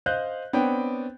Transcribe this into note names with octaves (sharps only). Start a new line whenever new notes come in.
C5 D#5 F5 F#6 G6
B3 C4 D4 C#5 G5